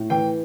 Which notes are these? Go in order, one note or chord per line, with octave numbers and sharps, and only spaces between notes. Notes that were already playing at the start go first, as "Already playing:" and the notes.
Already playing: A2
E3 G5